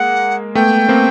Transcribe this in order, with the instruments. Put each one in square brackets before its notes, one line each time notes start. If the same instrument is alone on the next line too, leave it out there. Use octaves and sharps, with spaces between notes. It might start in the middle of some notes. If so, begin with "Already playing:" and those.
Already playing: [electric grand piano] G#3 A#3 [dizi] F#5
[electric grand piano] A3 B3 [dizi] G5
[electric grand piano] A#3 C4